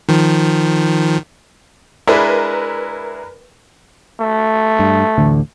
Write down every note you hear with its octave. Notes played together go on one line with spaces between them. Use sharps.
D#3 F3
G#3 D4 E4 A#4 B4
A3
G2
A1 D2 D3